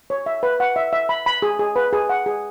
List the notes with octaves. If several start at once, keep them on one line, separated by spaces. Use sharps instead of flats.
C#5
E5
B4
F#5
E5
E5
B5
B5
G#4
G#4
B4
G#4
F#5
G#4